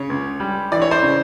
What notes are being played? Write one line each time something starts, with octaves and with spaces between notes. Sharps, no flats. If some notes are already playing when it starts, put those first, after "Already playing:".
Already playing: C#3 C#5
C#2
G3
E3 D5
C#5
C5 D5
C#3